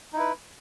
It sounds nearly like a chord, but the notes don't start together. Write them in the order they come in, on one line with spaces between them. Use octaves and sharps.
D#4 E4 B4